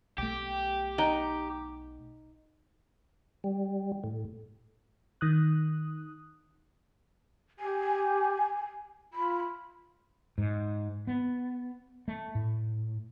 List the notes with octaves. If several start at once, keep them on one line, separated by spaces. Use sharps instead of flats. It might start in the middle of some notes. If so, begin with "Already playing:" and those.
B1 A3 G4
D#4 F#5 G5
G3
A2
D#3 D#6 F#6
G4 G#5
F4 B5
G#2
B3
A3
A2